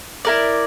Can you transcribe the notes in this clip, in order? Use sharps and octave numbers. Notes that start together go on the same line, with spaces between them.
E4 A#4 D5